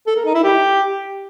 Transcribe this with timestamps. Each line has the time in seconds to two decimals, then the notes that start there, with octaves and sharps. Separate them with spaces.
0.07 A4
0.16 A#4
0.25 D#4
0.34 E4
0.44 G4